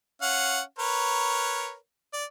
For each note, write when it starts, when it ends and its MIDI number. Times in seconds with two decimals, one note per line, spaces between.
0.22 0.61 61
0.22 0.61 77
0.22 0.61 78
0.79 1.75 70
0.79 1.75 71
0.79 1.75 73
2.13 2.25 74